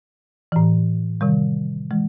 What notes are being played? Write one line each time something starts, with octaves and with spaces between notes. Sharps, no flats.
A2 E3
C3 D#3 G3
E3 G#3